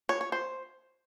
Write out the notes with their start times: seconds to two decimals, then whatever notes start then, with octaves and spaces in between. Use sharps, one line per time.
0.09 C#5
0.21 C#5
0.32 C5